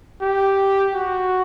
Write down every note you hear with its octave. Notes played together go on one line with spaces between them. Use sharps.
G4
F#4